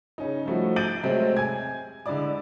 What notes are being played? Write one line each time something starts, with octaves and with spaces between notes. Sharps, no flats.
C#3 C#4 D#4
F3 G3 A3 D#4 F#4
G6 A6 D7 D#7 F#7
C3 F#3 G#3 A3 C4
G#5 G#6
D3 G#3 E4 D5 D6